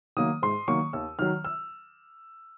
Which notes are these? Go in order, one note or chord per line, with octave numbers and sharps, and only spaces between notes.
D#3 F#3 A#3 D#6
G#2 C6
D#3 F#3 A#3 C#6
D#2 E6
D#3 F#3 F6
E6